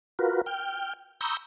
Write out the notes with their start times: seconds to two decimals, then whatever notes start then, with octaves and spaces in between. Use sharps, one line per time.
0.19 F4 F#4 A#4 B4
0.46 G5 F6
1.21 A#5 B5 C#6 D#6 E6 G6